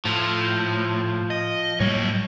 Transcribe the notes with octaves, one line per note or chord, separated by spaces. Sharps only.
A2 F3
D#5
A2 F#3 G3 A#3 C#5